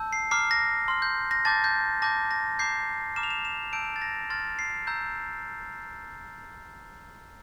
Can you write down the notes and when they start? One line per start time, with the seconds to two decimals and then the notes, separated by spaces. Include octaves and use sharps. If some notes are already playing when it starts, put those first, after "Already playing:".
Already playing: A5 E6 G6
0.13 C7
0.31 A#5 D6 F6 C7
0.51 A#6
0.88 C6 F6
1.02 G6
1.31 A#6
1.45 A5 D6 G6 A6
1.64 G6
2.02 A5 D6 G6 A#6
2.31 A#6
2.59 A#5 D6 G6 C7
3.16 A#5 D6 F6 E7
3.23 F7
3.30 E7
3.45 E7
3.73 A5 E6 G6 D7
3.96 A6
4.02 A#6
4.30 C6 F6 A6
4.59 C7
4.87 A#5 E6 G6